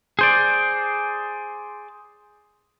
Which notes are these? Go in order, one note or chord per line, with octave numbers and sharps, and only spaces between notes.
G#4 C5 D5